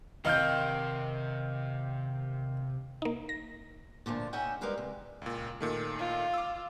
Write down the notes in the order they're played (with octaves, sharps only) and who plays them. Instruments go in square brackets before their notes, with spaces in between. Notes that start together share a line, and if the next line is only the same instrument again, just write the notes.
[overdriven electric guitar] C3 [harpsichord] D#3 [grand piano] F5 F6 G6
[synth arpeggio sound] A#3 D#4
A#6
[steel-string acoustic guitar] A#2 D3 F3 A3
C#4 D#4 G#4 E5 F#5 G5
G3 G#3 A#4 B4 F5
C3
[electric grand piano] C#2 A#2
A#2 D#3 A3
[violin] F4
[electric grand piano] D6 E6